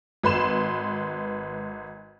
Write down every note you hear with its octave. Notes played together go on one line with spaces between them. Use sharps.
G#1 B4 C6 E7